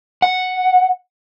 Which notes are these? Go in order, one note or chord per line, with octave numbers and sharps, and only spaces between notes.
F#5